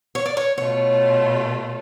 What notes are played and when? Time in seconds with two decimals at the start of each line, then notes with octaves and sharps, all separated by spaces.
0.15 C#5
0.26 D5
0.37 C#5
0.58 B2 A3 F4 C#5